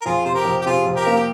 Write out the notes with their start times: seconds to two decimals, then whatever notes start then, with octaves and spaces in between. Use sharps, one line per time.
0.02 A#4
0.05 F2 F4 G#4
0.25 C3 C5
0.35 G4 A#4
0.45 F2
0.61 G4
0.66 C3 F4 G#4
0.86 F2
0.95 G4 A#4
1.06 A#3
1.16 G4